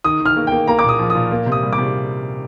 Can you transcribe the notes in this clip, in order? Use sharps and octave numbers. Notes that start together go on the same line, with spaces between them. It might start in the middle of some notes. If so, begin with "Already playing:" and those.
D#3 D#6
D#3
F6
A#3
A#3 G5
A#3 A#5
D6
A#2 D#6
F3
D#6
A#2
A#3
C3
D#6
G3
D6
C3